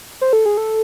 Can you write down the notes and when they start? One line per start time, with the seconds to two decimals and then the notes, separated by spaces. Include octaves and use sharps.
0.21 C5
0.33 A4
0.46 G#4
0.57 A4